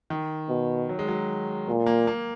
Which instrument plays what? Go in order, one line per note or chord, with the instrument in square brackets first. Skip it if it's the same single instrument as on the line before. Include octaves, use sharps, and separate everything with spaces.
[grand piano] D#3
[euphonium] B2
[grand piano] F#3
G#3
F#3
[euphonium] A#2
[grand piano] A#3
A#3